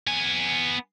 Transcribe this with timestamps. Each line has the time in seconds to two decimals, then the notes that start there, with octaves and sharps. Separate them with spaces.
0.08 B3 G#5